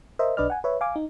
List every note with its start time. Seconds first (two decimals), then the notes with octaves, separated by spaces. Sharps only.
0.19 A#4 C5 D#5 E5
0.37 B1 D4 B4 D5 D#5 F6
0.50 F#5 G#5
0.64 B4 C#5 E5
0.81 F5 G#5 D6
0.96 D#4